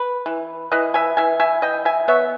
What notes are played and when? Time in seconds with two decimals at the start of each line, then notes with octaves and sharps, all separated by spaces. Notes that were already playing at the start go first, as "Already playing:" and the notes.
Already playing: B4
0.26 E3
0.72 E3 B4 D#5
0.94 E5 G#5
1.17 E3 E5 G#5
1.40 E5 G#5
1.62 E3 D#5 G5
1.85 E5 G#5
2.08 B3 C#5 E5